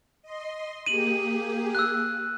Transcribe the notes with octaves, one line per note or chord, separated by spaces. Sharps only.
D#5 C6
A#3 G4 G#4 D#7 F#7
E6 F#6